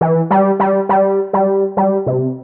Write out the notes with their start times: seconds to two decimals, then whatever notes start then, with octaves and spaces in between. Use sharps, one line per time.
0.01 E3
0.30 G3
0.60 G3
0.89 G3
1.33 G3
1.77 G3
2.07 C3